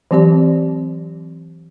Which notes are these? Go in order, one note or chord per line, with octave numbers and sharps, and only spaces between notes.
E3 F#3 C4 G4 D5